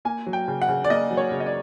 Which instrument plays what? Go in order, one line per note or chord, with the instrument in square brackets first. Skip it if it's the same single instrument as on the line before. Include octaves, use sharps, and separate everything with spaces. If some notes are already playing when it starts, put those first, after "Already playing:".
[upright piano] A#3 G#5
F#3
G5
C#3
F#5
C#3
D5
A#3 D#5
F#3
C#5
C#3
D#5
D5